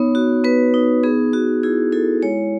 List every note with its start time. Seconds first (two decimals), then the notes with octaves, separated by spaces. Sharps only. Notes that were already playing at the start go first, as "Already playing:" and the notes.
Already playing: B3 D#4 C#5
0.15 F#4
0.44 B3 B4
0.74 D#4
1.03 B3 G#4
1.33 B3 F#4
1.63 E4 G#4
1.92 E4 A4
2.22 G#3 C#5